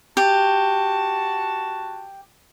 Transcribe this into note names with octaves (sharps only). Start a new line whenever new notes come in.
F#4 G4 A5